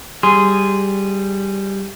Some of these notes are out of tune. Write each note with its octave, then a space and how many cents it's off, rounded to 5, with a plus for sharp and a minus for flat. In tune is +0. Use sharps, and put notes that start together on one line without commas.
G3 +0 G#4 -5 C6 -15